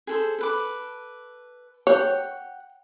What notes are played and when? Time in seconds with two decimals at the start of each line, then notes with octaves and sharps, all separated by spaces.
0.07 G#4 A4 C5
0.39 A4 B4 D6
1.87 C#5 F#5 G5